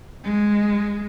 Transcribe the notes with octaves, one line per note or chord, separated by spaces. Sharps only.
G#3